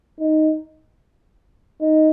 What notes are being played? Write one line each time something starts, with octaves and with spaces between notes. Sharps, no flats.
D#4
D#4